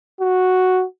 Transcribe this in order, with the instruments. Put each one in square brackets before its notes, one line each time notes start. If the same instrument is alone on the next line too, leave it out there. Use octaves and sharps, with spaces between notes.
[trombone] F#4